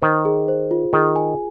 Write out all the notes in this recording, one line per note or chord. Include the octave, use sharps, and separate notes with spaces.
D#3 C5
G#4
C5
F4
D#3 G#4
G#5